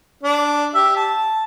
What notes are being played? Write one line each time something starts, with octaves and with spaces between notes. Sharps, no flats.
D4
G4 E5
A5